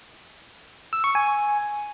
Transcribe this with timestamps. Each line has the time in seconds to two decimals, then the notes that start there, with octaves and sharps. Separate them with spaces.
0.93 E6
1.04 C#6
1.15 G#5